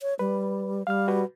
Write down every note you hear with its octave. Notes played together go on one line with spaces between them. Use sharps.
C#5
G3 B4
G3 F5 F6
F#4 B4